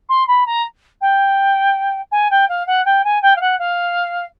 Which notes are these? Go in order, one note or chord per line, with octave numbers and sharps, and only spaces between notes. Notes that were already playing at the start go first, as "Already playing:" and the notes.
C6
B5
A#5
G5
G#5
G5
F5
F#5
G5
G#5
G5
F5
F#5
F5